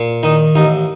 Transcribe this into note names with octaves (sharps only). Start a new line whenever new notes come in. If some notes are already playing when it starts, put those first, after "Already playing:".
Already playing: A#2
D#3 D#4
A1 D#4